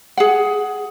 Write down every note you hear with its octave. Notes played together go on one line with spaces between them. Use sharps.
G#4 F#5